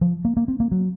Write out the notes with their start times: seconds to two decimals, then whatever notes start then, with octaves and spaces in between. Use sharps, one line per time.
0.01 F3
0.25 A#3
0.37 A#3
0.48 C4
0.60 A#3
0.72 F#3